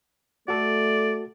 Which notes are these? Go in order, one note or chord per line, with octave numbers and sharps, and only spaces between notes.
A3 F#4 A4 D5